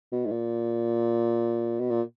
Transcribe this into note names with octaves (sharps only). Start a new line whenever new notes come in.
B2
G#2
A#2
B2
A#2